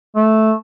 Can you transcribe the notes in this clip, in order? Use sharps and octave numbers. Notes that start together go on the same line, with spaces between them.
A3